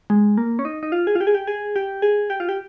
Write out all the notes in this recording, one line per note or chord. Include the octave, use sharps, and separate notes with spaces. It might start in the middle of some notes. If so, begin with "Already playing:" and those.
G#3
A#3
C#4
D#4
D#4
F4
G#4
F4
G4
G#4
G4
G#4
G4
G#4
G4
F4
G4